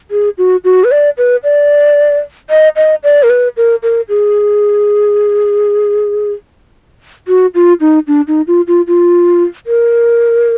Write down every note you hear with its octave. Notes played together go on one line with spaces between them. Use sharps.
G#4
F#4
F#4
B4
D5
B4
D5
D#5
D#5
D5
A#4
B4
A#4
A#4
G#4
F#4
F4
D#4
D4
D#4
F4
F4
F4
A#4